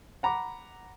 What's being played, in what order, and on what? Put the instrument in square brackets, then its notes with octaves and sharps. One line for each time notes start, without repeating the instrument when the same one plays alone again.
[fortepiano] F#5 A#5 B5 D6